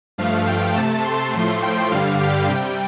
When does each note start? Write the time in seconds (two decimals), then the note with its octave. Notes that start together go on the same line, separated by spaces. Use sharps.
0.18 G2 F3 A3 F5
0.48 G5
0.76 C3 A3 A5
1.05 C6
1.34 A2 F3 A3
1.63 G5
1.91 G2 D3 G3 F5
2.20 G4
2.49 C3 G3 G5